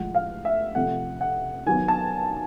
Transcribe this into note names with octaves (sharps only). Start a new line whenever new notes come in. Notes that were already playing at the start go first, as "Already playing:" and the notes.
Already playing: A2 F3 G#3 F#5
F5
E5
C3 F3 A3 F#5
F#5
D#3 F#3 B3 G#5
A5